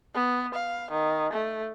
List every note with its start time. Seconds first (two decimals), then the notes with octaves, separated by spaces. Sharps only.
0.14 B3
0.54 F5
0.91 D#3
1.33 A3